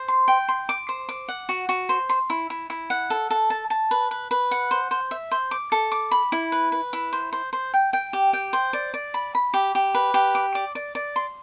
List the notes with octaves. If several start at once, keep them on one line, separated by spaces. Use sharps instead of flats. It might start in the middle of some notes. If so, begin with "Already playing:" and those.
Already playing: C5
C6
G5
C6
D6
C5
D6
F#5
F#4
F#4
C5
C6
E4
E4
E4
F#5
A4
A4
A5
A5
B4
B4
B4
F#5
C5
C5
E5
C5
D6
A4
D6
B5
E4
B4
B4
E4
C5
C5
C5
G5
G5
G4
G5
C5
D5
D5
B5
B5
G4
G4
B4
G4
D6
D5
D5
D5
C6